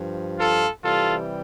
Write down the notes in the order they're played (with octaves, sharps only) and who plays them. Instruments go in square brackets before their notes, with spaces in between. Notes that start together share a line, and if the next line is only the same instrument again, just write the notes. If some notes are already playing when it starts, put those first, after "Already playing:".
Already playing: [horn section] G2 F3
F4 A4
C3 E3 G3 F4 A4